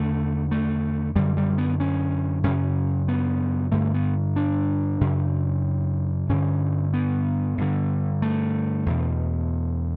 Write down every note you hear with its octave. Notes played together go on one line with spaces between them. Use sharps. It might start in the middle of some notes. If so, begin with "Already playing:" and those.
Already playing: E2 D3 A3
A3
F#2 D3 G3
G3
B3
C#4
F#2 C#3 C#4
B3
G2 D3 A3
B3
D4
F#2 C#3
G2 D3 C#4
B3
G2 D3
A3
E2 B2